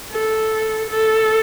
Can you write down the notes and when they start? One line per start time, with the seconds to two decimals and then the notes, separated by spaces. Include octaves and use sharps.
0.12 A4
0.90 A4